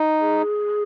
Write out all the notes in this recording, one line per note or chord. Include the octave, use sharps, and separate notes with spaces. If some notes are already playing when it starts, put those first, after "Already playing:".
Already playing: D#4
G#4